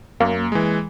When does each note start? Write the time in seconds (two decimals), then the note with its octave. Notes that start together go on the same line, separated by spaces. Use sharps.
0.20 F#2 A#3
0.52 E3 G#3